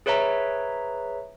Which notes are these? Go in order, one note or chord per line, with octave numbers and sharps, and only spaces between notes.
G#4 B4 C#5 E5 A#5